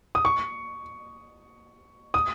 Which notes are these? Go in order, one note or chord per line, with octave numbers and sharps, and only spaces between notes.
D#6
C#6
D#6